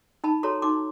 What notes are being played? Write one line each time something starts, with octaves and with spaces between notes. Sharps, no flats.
D#4 A5 B5
F#4 A4 C#5 A#5 C6
D#4 C6 D6